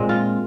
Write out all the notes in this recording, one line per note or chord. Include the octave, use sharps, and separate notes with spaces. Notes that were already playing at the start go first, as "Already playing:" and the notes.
Already playing: A#2 G#3 C4
F4